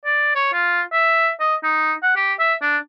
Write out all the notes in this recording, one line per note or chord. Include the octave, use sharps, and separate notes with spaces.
D5
C#5
F4
E5
D#5
D#4
F#5
G4
E5
D4